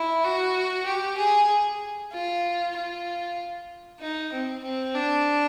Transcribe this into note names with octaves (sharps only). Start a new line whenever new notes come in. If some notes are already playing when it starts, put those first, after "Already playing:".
Already playing: E4
F#4
G4
G#4
F4
F4
D#4
C4
C4
D4